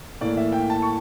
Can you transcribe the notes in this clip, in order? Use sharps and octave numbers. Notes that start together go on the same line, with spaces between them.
A2 E3 A#3 D5
E5
G5
A5
C#6